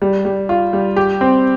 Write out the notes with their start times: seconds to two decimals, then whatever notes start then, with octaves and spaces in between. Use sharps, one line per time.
0.02 G3
0.25 G3
0.49 F4
0.73 G3
0.96 G4
1.21 C4